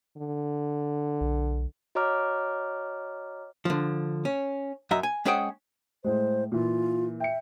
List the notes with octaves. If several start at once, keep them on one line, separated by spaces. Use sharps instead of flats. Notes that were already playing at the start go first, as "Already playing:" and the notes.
D3
B1
F#4 C#5 D#5 A#5 D6 F6
D3 F3
C#4
F#2 D#5 E5 A#5
G#5
G#3 C#4 G#4 C5 F#5 G5
A2 G#3 C5
A#2 E3 F4
E5 G5 C#7